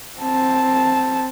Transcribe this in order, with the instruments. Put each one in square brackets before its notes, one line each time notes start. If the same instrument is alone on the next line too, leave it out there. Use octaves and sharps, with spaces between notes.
[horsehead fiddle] C4 A5